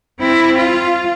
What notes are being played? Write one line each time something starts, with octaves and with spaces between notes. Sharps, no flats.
C4 E4
F4